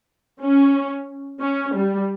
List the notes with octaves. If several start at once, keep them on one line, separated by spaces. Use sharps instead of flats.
C#4
C#4
G3